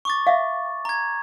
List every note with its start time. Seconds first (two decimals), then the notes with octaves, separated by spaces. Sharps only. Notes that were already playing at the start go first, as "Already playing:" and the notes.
0.05 C#6 D6 A6
0.27 E5 F5
0.85 A#5 G#6